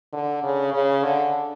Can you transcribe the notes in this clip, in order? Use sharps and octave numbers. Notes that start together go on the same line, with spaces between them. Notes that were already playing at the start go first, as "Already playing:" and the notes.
D3
C#3
C#3
D3